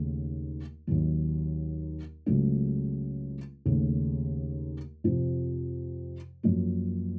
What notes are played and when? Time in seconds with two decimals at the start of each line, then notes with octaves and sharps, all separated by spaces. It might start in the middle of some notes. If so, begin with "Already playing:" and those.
Already playing: D#2 C#3 A3
0.87 D#2 D#3 F#3
2.26 C#2 C#3 F#3 A3 C#4
3.66 D#2 C#3 A3
5.04 F2 C3 F3
6.43 F#2 F3 A#3